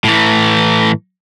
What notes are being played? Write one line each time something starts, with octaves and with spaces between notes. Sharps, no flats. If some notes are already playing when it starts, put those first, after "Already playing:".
A2 E3